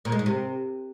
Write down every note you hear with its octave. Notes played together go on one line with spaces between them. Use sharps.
A#2
G#3
G#2
C3